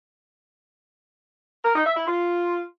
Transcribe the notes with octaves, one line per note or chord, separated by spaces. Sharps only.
A#4
D#4
E5
E4
F4